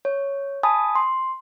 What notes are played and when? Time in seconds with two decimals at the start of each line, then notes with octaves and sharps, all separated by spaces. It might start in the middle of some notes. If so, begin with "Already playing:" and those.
0.05 C#5
0.63 G#5 A5 B5 D#6
0.95 C6